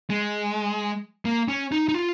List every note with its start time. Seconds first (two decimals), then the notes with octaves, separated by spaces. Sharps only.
0.10 G#3
1.25 A#3
1.48 C#4
1.72 D#4
1.89 D#4
1.94 F4